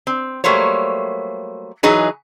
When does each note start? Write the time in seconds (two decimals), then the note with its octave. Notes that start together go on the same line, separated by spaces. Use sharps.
0.07 C4
0.44 F#3 G3 A3 A#3 C5 C#5
1.83 E3 F#3 D#4 G#4 B4